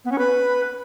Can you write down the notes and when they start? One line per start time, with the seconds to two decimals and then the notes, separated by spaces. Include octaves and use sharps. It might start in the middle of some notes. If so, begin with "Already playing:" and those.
0.05 B3
0.12 C#4
0.18 B4